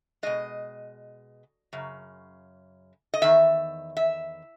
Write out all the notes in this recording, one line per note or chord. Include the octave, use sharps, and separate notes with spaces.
B2 G#3 D#5
F#2 C#3
D#5
E2 D#3 E5
E5